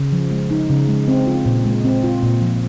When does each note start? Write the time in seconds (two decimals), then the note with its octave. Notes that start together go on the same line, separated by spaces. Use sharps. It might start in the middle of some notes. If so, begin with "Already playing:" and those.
Already playing: C#3
0.12 F3
0.31 G#3
0.51 D#4
0.70 C#3
0.89 G#3
1.08 C4
1.27 F4
1.46 A#2
1.65 G#3
1.85 C4
2.04 F4
2.23 A#2
2.42 F3